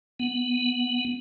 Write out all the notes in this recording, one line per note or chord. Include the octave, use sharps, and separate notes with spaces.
B3